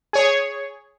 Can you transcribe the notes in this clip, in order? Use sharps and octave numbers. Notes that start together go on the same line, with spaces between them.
G#4 C#5